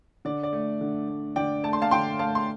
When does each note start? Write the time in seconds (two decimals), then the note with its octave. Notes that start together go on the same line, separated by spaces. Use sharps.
0.25 D3 D5
0.43 D5
0.53 A3
0.81 D3
1.08 A3
1.36 D3 D5 G5
1.64 A3 A5
1.73 C6
1.82 F5 A5
1.91 D3 G5 C6
2.19 A3 F5 A5
2.35 C6